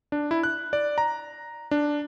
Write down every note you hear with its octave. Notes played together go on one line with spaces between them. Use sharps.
D4
E4
F#6
D5
A#5
D4